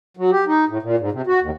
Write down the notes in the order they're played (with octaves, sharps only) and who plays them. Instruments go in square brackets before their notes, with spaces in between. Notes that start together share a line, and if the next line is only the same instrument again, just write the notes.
[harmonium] F#3
G4
D#4
A2
A#2
G#2
C3
F#4
D#2